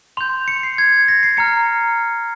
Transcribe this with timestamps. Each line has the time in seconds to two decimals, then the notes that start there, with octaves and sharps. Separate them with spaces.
0.17 C6 G6 F7
0.48 C#7
0.63 C7
0.78 G#6
1.08 A#6
1.23 C7
1.37 A#5 F6 C#7